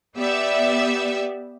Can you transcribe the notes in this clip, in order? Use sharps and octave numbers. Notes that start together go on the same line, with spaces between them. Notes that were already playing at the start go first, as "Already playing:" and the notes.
B3 G4 D5 E5